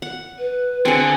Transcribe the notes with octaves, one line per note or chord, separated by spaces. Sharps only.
F#5
B4
D3 C4 G#4 G#5